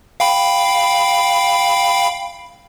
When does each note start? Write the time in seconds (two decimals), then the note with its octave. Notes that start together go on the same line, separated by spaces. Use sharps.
0.20 F5 G5 B5